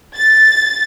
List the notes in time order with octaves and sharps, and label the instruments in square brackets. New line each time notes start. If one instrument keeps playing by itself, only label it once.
[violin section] A6